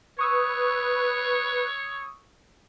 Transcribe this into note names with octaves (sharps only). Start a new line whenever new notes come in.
B4 C#5 C#6 D#6 E6